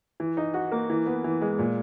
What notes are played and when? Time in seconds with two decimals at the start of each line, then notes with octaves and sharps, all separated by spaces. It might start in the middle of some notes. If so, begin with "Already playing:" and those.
0.20 E3
0.37 D#4
0.54 F#4
0.72 A#3
0.90 E3
1.06 B3
1.24 E3
1.41 G#3
1.59 A#2